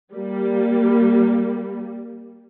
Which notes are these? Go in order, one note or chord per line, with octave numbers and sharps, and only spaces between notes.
G3 A#3